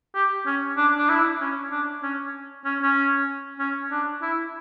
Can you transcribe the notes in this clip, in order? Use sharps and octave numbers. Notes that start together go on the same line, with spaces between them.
G4
C#4
D4
D4
E4
C#4
D4
C#4
C#4
C#4
C#4
D4
E4